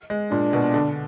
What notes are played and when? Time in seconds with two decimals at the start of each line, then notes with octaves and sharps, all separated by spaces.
0.10 G#3
0.31 A#2 D4
0.53 B2
0.74 D3